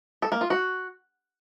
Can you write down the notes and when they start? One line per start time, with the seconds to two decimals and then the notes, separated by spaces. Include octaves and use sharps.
0.22 A4
0.32 A#3
0.41 F4
0.50 F#4